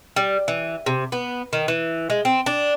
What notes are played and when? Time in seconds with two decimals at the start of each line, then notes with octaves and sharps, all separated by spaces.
0.16 G3
0.48 E3
0.86 C3
1.12 B3
1.53 D#3
1.68 E3
2.10 G#3
2.25 C4
2.46 D4